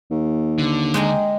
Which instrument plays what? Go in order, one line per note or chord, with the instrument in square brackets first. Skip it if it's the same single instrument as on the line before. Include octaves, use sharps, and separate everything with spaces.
[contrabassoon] D#2
[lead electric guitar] D3
[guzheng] G#3 G5 A#5